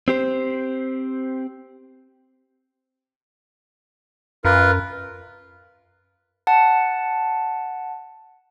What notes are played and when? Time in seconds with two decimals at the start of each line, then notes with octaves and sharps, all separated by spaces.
0.08 C4 G4 C5
4.45 F#2 F4 A#4 B4
6.47 F#5 A5